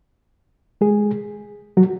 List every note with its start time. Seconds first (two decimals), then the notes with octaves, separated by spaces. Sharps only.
0.81 G#3 G#4
1.77 F#3 F#4